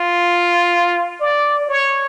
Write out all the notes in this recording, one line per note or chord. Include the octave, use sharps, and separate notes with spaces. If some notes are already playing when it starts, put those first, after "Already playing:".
Already playing: F4
D5
C#5